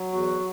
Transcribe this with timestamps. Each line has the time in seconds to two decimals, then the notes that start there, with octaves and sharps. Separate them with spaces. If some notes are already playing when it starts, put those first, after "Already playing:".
Already playing: F#3
0.13 E2 F#4